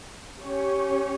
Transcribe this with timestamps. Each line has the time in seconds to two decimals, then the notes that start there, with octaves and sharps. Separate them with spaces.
0.42 C#4 G4 C#5